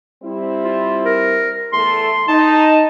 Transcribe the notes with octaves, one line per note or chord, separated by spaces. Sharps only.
G3 C4 E4
F4
A#4
E2 A3 A4 C6
D#4 A5